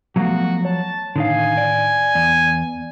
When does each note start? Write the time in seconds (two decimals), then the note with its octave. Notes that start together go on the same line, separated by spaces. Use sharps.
0.16 F3 F#3 A3 B3 F#4
0.65 C#5 A5
1.16 A2 D3 D#3 D#4 F5 G#5
1.58 D5
2.15 E2 B3 D5